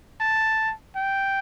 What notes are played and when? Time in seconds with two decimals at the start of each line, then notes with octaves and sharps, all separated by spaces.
0.21 A5
0.96 G5